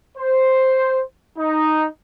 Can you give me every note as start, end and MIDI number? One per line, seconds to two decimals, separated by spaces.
0.17 1.02 72
1.38 1.85 63